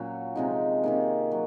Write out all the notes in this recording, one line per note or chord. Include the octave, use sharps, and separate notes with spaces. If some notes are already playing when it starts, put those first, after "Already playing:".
Already playing: A#2 F#3 A#3 C#4 F#4
C3 F3 G#3 D#4
C3 D#3 A#3
F#3